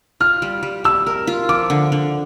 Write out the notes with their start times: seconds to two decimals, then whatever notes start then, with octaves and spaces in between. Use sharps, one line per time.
0.20 F4 F6
0.42 G3
0.63 G3
0.84 G3 E6
1.06 A#4
1.27 F4
1.49 F3 D6
1.70 D3
1.92 D3